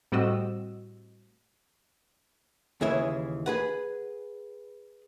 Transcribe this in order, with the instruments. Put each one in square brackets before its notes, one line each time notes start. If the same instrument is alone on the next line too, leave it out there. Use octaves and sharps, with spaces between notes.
[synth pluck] A2 G3 C4 F#4 D#5 E6
[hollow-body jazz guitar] D#2 C#3 E3 G#4 E5
G#4 B4 F#5